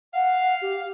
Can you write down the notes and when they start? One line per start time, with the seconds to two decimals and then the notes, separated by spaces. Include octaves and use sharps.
0.14 F5 F#5
0.62 G4